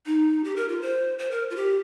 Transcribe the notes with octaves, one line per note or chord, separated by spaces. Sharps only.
D#4
G4
A#4
F4
C5
C5
A#4
F4
G4